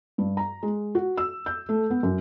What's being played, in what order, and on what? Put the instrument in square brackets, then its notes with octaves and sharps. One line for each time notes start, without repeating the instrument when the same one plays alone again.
[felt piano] G2
A#5
G#3
F#4
E6
G6
A3
B3
F#2